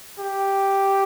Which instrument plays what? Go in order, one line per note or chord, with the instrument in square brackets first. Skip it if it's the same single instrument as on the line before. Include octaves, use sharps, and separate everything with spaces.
[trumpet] G4